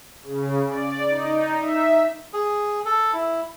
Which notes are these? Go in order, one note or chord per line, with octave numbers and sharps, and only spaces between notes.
C#3
D5
D#4
E5
G#4
A4
E4